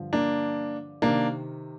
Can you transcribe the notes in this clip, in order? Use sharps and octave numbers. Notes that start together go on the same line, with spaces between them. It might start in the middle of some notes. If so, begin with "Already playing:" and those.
Already playing: G2 D3 F3
A#3 D4
C3 D#3 A#3 D4